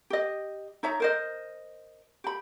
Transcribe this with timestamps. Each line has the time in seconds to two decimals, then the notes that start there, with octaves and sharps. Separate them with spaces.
0.10 G4 D#5
0.83 D#4 C#5 E5 A#5
1.00 A#4 C5 D#5
2.24 G4 B5